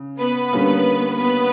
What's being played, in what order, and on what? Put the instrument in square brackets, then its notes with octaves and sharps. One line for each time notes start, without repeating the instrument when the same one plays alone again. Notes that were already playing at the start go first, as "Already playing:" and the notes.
Already playing: [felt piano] C#3
[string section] B3 B4
[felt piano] D3 G3 A#3 C#4
[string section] B3 B4